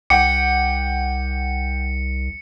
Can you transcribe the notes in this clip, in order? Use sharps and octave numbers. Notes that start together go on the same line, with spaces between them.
C2 F#5 G5 D6 C#7